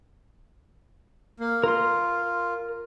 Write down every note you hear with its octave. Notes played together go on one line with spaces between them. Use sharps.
A#3
F4 A#4 C6